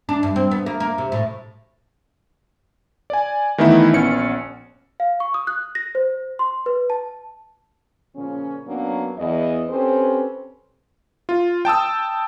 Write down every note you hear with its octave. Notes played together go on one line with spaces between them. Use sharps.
D4
G2
C4
B3
A#3
A#3
C3
A2
D5 G#5
D#3 E3 A3 B3 D#4 E4
A#1 B3 C#4 C#7
F5
C#6
D#6
F#6
A#6
C5
C6
B4
A5
A#2 C#3 F3 C#4
F#3 A#3 B3 C#4 D4
E2 D#5
C4 C#4 G4 A4 B4 C5
F4
G5 A5 D#6 E6